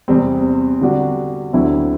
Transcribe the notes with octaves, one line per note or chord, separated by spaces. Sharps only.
E2 C3 G3 C4
D3 G3 D4 F#4
D2 D3 F#3 C4 E4